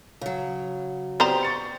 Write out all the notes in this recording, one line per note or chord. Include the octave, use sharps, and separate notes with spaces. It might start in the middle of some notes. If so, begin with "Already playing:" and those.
C#3 F#3
B3 C4 G4 C5 D5 A#5
C#6 A6 C#7